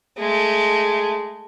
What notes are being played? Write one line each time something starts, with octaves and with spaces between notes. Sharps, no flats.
G#3 A3